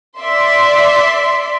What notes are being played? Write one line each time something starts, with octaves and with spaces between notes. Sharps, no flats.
D5 E5 C6